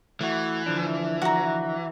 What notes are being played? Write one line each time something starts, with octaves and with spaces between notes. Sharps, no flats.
E3 A3 F#4
D3 F3 D4
F#4 A#5